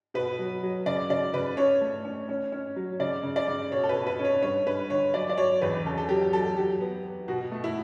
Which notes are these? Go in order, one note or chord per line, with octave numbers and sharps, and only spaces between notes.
B2 B4
F#3
F#3
C#3 D5
C#3 D5
C#3 B4
C#4 C#5
A3
C#4
C#4
C#4
F#3
C#3 D5
C#3
D5
C#3
B2 C#5
A4
B4
B2
B4
C#4
C#5
G2 C#5
G2 B4
D3 C#5
F#3 D5
D5
F#3 C#5
E2 B4
C#3 A4
A4
F#3 G4
F#3 A4
F#3 G4
B3
B3
B2 F#4
A3
E4